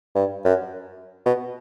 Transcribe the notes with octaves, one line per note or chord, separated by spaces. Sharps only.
G2
F#2
B2